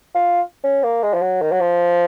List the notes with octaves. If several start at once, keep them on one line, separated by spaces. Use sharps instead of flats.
F4
C#4
A#3
G#3
F3
F#3
D#3
F#3
F3